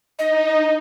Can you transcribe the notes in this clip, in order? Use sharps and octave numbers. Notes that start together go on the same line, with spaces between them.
D#4 D#5